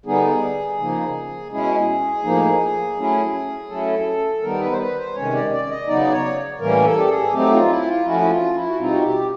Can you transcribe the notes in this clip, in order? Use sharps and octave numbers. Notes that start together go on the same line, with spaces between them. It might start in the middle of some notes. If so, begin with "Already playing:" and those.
D3 G3 B3 D#4 G#4
C#3 F3 A#3 D#4
B2 G#3 C#4 E4 G#4
A2 F3 A#3 D#4
F#3 A3 C#4 E4
F#3 A3 C#4 E4 A4
D#3 G3 B3 D#4 A#4
B4
C5
B4
C5
C3 D#3 G#3 C#4 C#5
D5
D5
D#5
C#3 F#3 B3 D#4 D5
C#5
A2 E3 G3 A#3 C#4 A#4
A4
G4
G#4
F#3 A3 C4 D#4 G4
F4
E4
F4
F3 A3 C#4 E4 F#4
E4
F4
E4
F#4
B2 G3 C4 D#4 F4
F#4
G4